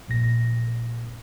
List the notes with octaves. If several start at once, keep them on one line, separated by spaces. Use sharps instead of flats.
A#1 A#2 A#6